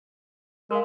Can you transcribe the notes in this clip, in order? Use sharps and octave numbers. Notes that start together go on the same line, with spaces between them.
G#3 A#4 F5